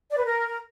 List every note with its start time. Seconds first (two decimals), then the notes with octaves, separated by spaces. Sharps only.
0.11 D5
0.18 B4
0.25 A#4